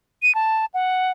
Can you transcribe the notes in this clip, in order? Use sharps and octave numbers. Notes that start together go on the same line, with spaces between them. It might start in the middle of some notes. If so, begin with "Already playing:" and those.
D#7
A5
F#5